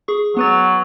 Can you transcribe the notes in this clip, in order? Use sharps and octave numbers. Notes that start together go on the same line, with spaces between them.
G#4 C#6
F#3 B3 B4 A6